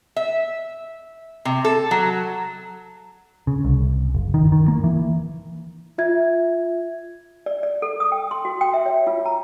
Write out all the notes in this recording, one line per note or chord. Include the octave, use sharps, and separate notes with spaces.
E5
C3
A4
F#3
C#3
C2
F#1
D#3
D#3
A#3
E3
F4 E5 G#6
D5
D5
A4
D#6
G5
C6
F#4
G5
E5
C#5
F4
A#5